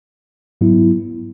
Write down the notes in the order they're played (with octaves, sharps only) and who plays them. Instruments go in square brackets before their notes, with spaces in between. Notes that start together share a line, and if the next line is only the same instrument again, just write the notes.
[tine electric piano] G#2 F#3 B3 E4